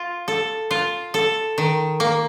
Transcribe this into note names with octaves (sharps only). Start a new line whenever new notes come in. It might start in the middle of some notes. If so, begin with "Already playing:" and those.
Already playing: F4
A4
F4
A4
D#3
A#3